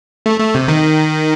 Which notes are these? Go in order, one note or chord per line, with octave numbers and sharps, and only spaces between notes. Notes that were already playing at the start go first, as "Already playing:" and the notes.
A3
A3
C3
D#3